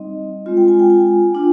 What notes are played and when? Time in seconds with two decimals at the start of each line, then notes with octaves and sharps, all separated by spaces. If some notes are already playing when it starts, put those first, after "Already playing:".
Already playing: G3 C4 D#4 D#5
0.46 G#3 C4 F4
0.57 G5
0.68 G#5
0.79 G5
0.90 G#5
1.33 A#3 D4 F4